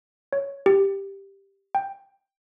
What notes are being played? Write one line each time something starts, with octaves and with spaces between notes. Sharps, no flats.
C#5
G4
G5